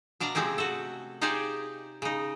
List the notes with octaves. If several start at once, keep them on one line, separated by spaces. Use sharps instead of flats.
B2 D4 D5 F5 A#5
C3 F3 G#3 A3 C4 C#4
F#4 A4
D#4 F4 G4 G#4 C5 D5
C#3 D#4